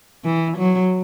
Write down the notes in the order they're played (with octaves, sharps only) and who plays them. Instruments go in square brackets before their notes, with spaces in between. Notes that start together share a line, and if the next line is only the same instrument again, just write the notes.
[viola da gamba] E3
F#3